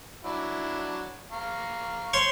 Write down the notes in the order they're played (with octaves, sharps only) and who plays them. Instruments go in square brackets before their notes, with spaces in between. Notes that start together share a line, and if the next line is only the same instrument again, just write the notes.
[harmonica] F#3 D4 E4
F5 A#5 C#6
[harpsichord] C5 C#5 C6